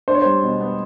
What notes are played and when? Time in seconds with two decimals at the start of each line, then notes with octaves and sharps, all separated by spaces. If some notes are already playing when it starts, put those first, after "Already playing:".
0.08 D4 C5
0.15 C#5
0.22 G3 C5
0.43 B2
0.61 B3